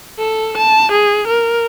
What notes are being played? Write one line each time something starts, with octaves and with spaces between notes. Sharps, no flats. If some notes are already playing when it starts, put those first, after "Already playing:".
A4
A5
G#4
A#4